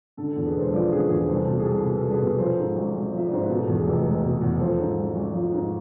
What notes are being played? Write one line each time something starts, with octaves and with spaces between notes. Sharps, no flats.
D3 A4
E2 A4
G#4 B4
E1 A4 C5
F3 B4 D5
D3 G#4 B4
E2 G#4 B4
C2 A4 C5
B2 A4
G#4
C2 A4
B2 B4
A4
C2
G#4 B4
B2
F3 A4 C5
G#2
G#1
G#1
F3 E5
D5
G#2 C5
B4
B2 A4
E2
G#4 B4
F1
F1
B2
E2
F3 A4 C5
G#2
G#1
G#1
F3
G#2